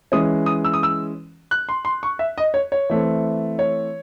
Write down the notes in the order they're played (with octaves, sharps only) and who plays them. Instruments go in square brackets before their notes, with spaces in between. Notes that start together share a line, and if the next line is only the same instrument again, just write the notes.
[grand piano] E3 G#3 C#4 D#6
D#6
E6
D#6
E6
F#6
C6
C6
C#6
E5
D#5
C#5
C#5
E3 A3 C4
C#5